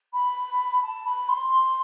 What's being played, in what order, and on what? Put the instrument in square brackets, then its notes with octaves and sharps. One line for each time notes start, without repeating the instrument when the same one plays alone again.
[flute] B5
A5
B5
C6